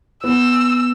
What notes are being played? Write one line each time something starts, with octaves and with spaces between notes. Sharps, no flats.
B3 E6